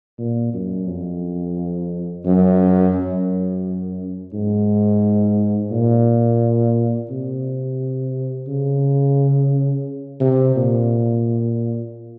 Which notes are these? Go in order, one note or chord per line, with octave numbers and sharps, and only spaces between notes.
A#2
F#2
F2
F#2
F#2
G#2
A#2
C3
C#3
C3
A#2